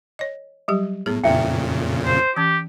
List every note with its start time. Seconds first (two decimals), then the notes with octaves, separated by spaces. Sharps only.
0.19 C#5 D#5
0.68 F#3 G3 G4
1.06 A2 B3 G#4
1.24 F2 A#2 C#3 E4 E5 G5
2.06 C5
2.37 E3 C#4 G4